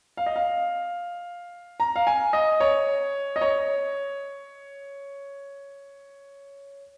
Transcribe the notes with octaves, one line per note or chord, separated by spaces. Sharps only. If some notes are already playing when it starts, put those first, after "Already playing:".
F5
D#5
F5
A#5
F5
G#5
D#5
C#5
D#5
C#5